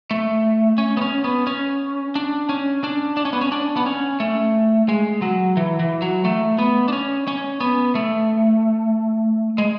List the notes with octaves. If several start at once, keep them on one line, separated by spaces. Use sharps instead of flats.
A3
C#4
B3
C#4
B3
C#4
D4
C#4
D4
D4
C#4
B3
C#4
D4
B3
C#4
A3
G#3
F#3
E3
E3
F#3
A3
B3
D4
C#4
C#4
B3
A3
G#3